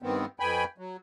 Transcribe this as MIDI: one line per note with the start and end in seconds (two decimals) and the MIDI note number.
0.02 0.25 43
0.02 0.25 51
0.02 0.25 59
0.02 0.25 60
0.40 0.64 41
0.40 0.64 59
0.40 0.64 79
0.40 0.64 80
0.40 0.64 83
0.78 0.97 54